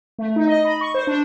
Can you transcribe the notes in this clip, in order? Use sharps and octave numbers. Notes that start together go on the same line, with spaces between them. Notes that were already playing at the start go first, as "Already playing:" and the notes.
A3
D#4
D#5
B5
C#6
C5
D4